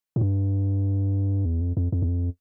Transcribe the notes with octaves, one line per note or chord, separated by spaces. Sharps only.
A2
G2
E2
F2
F2
F2
E2
F2